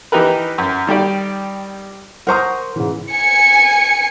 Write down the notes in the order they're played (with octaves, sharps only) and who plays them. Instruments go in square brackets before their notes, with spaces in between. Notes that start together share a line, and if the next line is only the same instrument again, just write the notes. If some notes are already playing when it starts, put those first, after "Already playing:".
[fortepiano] E3 D#4 G4 A#4 B4
F#2
D#3 G3 G4 D5
[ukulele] A#4 C5 A#5 [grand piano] F#5 C#6 D#6
[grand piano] G#2 C#3 E3
[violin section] G#5 C#7